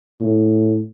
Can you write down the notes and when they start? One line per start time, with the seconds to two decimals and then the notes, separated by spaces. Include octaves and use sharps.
0.20 A2